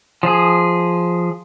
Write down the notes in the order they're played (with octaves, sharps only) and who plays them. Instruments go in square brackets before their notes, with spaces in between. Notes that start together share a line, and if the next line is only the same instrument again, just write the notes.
[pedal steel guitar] F3 G#4